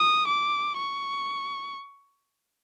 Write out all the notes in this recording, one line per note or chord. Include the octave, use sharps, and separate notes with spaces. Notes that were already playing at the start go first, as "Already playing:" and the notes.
Already playing: D#6
D6
C#6